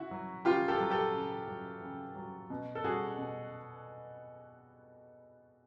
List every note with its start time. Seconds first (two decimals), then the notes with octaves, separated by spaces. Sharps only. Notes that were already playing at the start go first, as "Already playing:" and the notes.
Already playing: C#3 E4 F#4
0.11 F#3
0.45 C#3 F4 G4
0.68 G4 A4
0.80 F#3
0.90 G4 A4
1.14 C#3
1.48 F#3
1.82 C#3
2.16 F#3
2.50 B2
2.75 A4
2.84 G3 F#4 G#4
3.18 B2